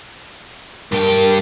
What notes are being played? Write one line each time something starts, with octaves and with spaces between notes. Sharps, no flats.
G2 G4 A#4